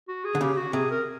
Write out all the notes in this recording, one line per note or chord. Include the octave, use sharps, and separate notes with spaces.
F#4
G#4
D3
C#3 G4
F#4
C3 G#4
A#4